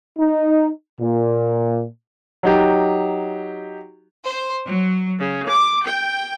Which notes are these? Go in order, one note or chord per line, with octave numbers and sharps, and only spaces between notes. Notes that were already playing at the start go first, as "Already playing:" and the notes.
D#4
A#2
F#3 D#4 G4
C5
F#3
C#3
D6
G5